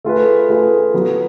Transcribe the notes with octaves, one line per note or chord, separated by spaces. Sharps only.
A3 F4 G#4 B4
A3 F4 G#4 B4
F#3 B3 F#4